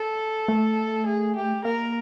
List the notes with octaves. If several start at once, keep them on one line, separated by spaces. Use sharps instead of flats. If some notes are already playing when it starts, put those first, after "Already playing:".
Already playing: A4
A3
G#4
G4
A#3 A#4